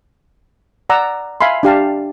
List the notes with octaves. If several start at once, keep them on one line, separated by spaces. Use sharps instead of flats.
D5 F#5 A#5 E6
E5 F5 G#5 B5 C6
D4 G4 F5 A5